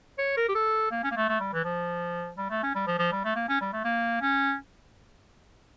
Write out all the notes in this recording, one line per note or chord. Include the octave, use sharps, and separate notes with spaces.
C#5
A#4
G4
A4
A#3
C#4
A#3
A3
A3
G3
E3
F3
G3
A3
C#4
G3
F3
F3
G3
A3
A#3
C#4
G3
A3
A#3
C#4